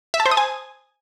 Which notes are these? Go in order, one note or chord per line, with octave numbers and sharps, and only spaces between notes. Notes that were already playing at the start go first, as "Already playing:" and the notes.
E5
A5
C5
D#6
G#5